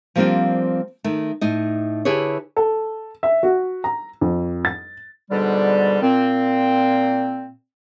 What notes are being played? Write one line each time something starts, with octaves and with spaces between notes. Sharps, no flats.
F3 G3 A#3 C4 D4 F4
D#3 A3
A2 D#4 D#5
D3 E4 G4 G#4 B4 C#5
A4
E5
F#4
A#5
F2
A6
G#2 B2 D3 G3
A#2 C4